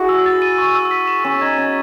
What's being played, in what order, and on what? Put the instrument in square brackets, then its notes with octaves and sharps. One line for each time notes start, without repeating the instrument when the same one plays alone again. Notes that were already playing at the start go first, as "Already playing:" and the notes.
Already playing: [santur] E4 F#4 G#4
[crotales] E6
A6
D#7
C#6
E6
B6
E7
[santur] C#4 [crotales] C#6
[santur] D#4 [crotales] G#6
[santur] C#4 [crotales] B6